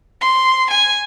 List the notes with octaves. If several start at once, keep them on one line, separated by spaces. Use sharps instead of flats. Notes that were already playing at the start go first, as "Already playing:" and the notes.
C6
G#5